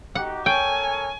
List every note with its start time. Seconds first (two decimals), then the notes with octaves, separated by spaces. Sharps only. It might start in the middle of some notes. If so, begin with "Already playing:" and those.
0.15 D#4 F#4 G4 F#5
0.46 A4 A#4 C#5 G5 G#5